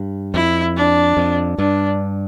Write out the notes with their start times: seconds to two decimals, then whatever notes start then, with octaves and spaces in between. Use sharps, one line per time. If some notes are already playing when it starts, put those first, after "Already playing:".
Already playing: G2
0.34 F2 E4
0.76 D4
1.17 F2
1.58 G2 D4